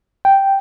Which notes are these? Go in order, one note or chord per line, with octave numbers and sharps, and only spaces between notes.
G5